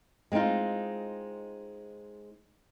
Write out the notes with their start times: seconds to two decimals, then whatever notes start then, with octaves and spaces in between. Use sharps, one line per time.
0.32 G#3 C4 C#4 D#4 F4